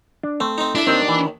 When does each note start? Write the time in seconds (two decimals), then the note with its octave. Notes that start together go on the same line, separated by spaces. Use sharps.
0.23 D4
0.40 A3 C4
0.58 C4 D#4
0.75 D4 E4 E5
0.87 D#2 D#3 C4
1.08 E3